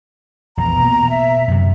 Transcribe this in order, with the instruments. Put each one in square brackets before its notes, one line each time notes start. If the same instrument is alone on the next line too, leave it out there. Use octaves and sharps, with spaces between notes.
[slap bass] A#1 E2 [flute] A#5
[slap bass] B2 A#3
[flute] E5
[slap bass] F#2 C3